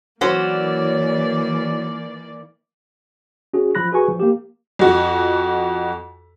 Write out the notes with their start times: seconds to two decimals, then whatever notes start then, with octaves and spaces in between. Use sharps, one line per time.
0.21 E3 F#3 A#3 C#4 C5 D5
3.54 C#4 F#4 G#4
3.75 F3 F4 B5 F#6 A#6
3.92 F#4 G#4 B4 G#5 C#6
4.08 F3
4.20 A#3 G4
4.79 F2 F#4